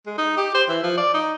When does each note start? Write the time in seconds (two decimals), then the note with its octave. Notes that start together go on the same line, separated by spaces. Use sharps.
0.06 G#3
0.18 D#4
0.37 G4
0.54 C5
0.69 E3
0.83 F3
0.97 D5
1.14 D#4